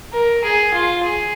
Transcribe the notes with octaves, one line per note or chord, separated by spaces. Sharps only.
A#4
G#4
F4
G#4